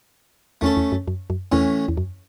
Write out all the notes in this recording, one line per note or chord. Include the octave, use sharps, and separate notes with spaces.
E2 A3 C#4 A4
E2
F#2
F#2
F#2
E2 A2 E3 C#4
E2
F#2